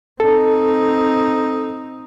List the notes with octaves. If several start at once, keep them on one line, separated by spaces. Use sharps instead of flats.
C4 D#4 A4